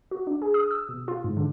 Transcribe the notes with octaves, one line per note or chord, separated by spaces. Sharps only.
F#4
D4
G#4
D#6
E6
B2
F4
G#2
D3